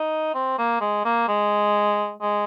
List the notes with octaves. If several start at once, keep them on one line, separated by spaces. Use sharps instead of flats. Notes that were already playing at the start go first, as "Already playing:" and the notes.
Already playing: D#4
C4
A#3
G#3
A#3
G#3
G#3